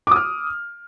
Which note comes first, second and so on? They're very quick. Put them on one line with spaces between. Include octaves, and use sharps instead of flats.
D6 D#6 F6